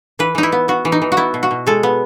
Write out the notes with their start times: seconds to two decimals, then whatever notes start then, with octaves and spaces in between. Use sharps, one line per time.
0.19 E3 B4
0.35 E3 D#4
0.43 E4
0.52 B3
0.68 B3 F#4
0.85 E3
0.92 D#4
1.02 E3
1.12 F#4
1.17 B3 E4
1.34 B2
1.43 F#4
1.51 B2
1.67 G#3 A4
1.83 B3